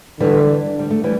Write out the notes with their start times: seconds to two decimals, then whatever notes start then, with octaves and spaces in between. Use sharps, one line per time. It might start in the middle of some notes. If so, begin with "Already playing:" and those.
0.20 D3 E3 G3
0.79 G3
0.90 A3
1.04 E3 G3